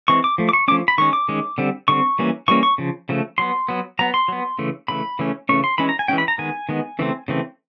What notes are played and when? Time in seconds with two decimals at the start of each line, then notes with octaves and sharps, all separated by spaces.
0.08 E3 G#3 C4 C#6
0.24 D6
0.38 F3 A3
0.49 D6
0.53 C#6
0.68 F3 A3 C#4 D6
0.88 B5
0.98 D#3 G#3 C#4 C#6
1.13 D6
1.29 D#3 G#3 C#4
1.58 D3 G3 C4
1.88 D3 G3 C4 C#6
2.19 E3 G3 A#3 C#4
2.48 E3 G3 A#3 C#4 C#6
2.63 C#6
2.78 C#3 F3
3.09 C#3 F3 A3
3.38 F#3 B3 C6
3.69 F#3 B3
3.99 F#3 B3 A#5
4.14 C6
4.28 F#3 B3
4.59 C#3 E3 A3
4.88 C#3 E3 A3 B5
5.19 C#3 E3 A3 C#4
5.49 C#3 E3 A3 C#4 C#6
5.64 C6
5.78 E3 G#3 C#4 B5
5.89 A#5
5.99 G#5
6.08 E3 G#3 C#4 G5
6.18 B5
6.28 A#5
6.38 D#3 G#3 B3 G#5
6.69 D#3 G#3 B3
6.99 C#3 E3 A3 C4
7.28 C#3 E3 A3 C4